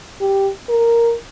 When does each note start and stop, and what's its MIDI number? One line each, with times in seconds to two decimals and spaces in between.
0.21 0.50 67
0.69 1.15 70